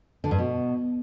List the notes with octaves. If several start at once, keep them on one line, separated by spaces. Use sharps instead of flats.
D3
G2
B2